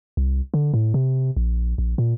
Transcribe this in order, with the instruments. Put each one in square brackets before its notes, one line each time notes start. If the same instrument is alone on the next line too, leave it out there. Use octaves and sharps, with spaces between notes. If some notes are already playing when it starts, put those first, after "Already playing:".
[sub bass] C2
D3
A2
C3
A#1
A#1
A#2